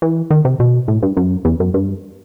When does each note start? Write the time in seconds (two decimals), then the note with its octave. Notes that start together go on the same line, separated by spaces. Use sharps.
0.02 E3
0.30 D#3
0.45 C3
0.60 B2
0.88 A2
1.02 G2
1.17 F#2
1.45 E2
1.60 F#2
1.74 G2